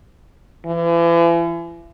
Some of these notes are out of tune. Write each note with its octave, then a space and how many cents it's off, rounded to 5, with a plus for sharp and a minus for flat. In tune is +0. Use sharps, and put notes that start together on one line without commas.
E3 +40